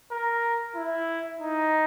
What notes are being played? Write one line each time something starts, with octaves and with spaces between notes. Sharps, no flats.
A#4
E4
D#4